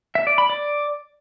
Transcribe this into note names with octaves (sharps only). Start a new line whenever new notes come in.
E5
D5
B5
D5